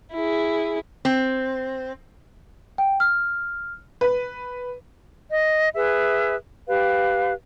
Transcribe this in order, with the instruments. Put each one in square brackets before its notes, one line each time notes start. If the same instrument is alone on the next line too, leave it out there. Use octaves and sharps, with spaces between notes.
[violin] E4 G#4
[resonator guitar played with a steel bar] C4
[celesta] G5
F6
[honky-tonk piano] B4
[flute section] D#5
G#4 B4 E5
G4 B4 F5